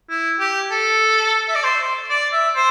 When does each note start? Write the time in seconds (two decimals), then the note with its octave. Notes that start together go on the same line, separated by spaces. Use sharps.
0.09 E4
0.40 G4
0.71 A4
1.48 E5
1.55 D5
1.63 C5
2.10 D5
2.32 E5
2.55 C5